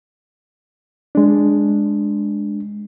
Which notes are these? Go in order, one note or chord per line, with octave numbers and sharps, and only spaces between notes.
G#3 D4